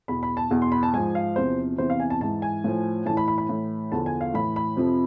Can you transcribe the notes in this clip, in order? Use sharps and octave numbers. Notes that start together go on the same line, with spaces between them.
E2 B2 B5
B5
A5
E2 B2
C6
B5
A5
G#2 F3 G#5
F5
E2 C3 F3 C5
E2 C3 E3 C5
F5
G#5
A5
G#2 E3 A5
G#5
A2 F3
A2 E3 A5
B5
B5
B5
A2 E3
E2 D3 F3 A5
G#5
F5
A2 E3 B5
B5
F2 C3 F3